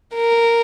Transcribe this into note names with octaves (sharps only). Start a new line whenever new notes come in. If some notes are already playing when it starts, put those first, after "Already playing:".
A#4